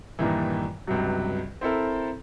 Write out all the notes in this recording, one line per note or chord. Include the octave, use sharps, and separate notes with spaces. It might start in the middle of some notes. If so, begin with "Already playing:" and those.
G2 A#2 D#3 E3
C#2 G2 C3 F#3
C4 E4 A4 A#4